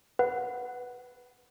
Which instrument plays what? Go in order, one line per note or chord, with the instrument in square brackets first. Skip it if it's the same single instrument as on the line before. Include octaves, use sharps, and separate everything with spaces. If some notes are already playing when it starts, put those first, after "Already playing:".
[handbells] B4 [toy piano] F#5